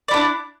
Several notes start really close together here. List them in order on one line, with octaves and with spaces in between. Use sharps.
D5 E4 D4